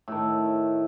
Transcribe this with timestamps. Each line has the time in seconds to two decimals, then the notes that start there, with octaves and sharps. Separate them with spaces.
0.08 A2 D#3